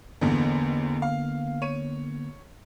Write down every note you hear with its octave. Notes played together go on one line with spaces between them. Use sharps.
A1 E2 D3 A#3 B3
F5
C#5 D#7